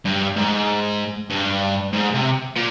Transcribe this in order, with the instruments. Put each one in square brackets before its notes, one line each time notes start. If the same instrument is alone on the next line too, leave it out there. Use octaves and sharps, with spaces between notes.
[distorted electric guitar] G2
G#2
G2
G#2
C3
A#2